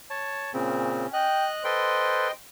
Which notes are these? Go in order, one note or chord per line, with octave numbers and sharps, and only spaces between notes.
C#5 A5
A#2 C#3 C4 C#4
D#5 G5 F#6
A4 B4 C5 D#5 G5 C6